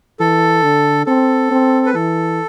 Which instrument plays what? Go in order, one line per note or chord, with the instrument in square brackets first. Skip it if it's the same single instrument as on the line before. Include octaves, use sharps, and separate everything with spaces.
[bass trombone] E3 [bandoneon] A4
[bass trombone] D3
[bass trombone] C4 [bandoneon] A4
[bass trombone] C4
[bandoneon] B4
[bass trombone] E3 [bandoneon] A4